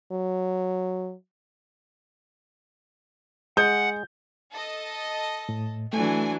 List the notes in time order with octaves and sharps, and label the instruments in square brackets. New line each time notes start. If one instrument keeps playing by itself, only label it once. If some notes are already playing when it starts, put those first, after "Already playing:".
[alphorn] F#3
[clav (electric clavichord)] G#3 G#4 [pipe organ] F#5 [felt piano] G6
[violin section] A4 D#5
[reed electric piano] A2
[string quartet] E3 F#3 D4 [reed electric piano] A3 [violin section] G#5